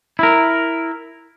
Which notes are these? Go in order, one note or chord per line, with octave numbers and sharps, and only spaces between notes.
E4 A#4